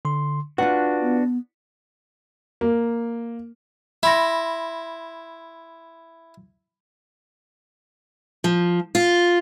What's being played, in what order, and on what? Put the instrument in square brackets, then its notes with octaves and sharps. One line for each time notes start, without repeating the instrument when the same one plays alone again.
[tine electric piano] D3 C6
[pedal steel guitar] D4 F#4 [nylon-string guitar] F4 F#5 [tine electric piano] B4
[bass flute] B3
[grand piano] A#3
[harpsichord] E4 [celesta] B5 C6 A#6
[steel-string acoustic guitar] F3
F4